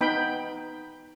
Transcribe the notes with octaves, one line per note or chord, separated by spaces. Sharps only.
B3 D#4 G5 B5